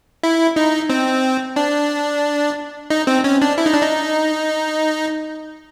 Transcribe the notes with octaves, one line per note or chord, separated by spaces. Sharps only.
E4
D#4
C4
D4
D#4
C4
C#4
D4
E4
D#4
D4
D#4